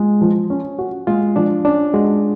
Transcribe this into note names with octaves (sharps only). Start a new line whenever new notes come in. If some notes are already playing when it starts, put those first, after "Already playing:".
Already playing: G#3 F4
F3
C#4
F#4
G#3 F4
F3 D4
C#4 D4
G#3 F#4